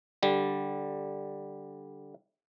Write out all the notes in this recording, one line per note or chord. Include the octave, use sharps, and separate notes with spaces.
D3 G3